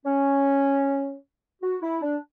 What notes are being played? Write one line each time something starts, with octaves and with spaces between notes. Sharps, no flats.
C#4
F#4
E4
D4